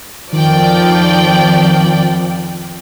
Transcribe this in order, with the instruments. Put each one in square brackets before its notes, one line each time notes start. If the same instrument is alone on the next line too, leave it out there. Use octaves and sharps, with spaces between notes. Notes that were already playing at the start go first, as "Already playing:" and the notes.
[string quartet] F2 F3 [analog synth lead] D#3 [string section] D5 G5